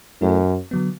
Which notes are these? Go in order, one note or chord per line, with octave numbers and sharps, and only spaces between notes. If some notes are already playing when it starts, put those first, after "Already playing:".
F#2 A3 E4 A4
D3 F#3 B3